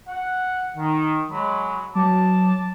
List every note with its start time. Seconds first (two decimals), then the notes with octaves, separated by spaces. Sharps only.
0.09 F#5
0.77 D#3
1.30 F#3 G#3 B5
1.95 F#3 A5 D6